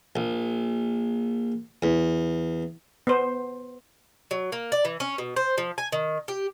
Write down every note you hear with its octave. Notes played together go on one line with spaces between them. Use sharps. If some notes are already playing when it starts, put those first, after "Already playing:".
A#1
E2
B3 C5
F#3
A#3
D5
E3
C#4
B2
C5
F3
G#5
D#3
G4